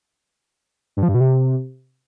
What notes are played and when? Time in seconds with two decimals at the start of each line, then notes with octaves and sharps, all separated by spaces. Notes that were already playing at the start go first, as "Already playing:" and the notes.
0.97 G2
1.03 F3
1.08 G2
1.14 B2
1.20 C3